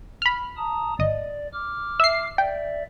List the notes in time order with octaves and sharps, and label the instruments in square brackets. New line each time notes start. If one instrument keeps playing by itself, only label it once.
[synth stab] B5 F6
[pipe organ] A5 A#5 D#6
[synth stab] G#1 D#5 [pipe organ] D5
[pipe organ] D6 F6
[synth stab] E5 C7
[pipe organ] D5 E5 [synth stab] G5